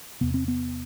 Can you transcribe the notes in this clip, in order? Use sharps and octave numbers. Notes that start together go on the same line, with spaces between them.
E2 C3 B3
C4
B3